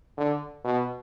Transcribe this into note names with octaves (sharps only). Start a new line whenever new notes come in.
D3
B2